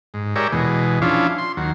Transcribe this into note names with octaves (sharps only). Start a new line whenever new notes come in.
G#2
G#3 G4 A#4 C#5 D5 E5
E2 B2 G#3
F3 C#4 D4 E4 F4
C6
D#2 F#3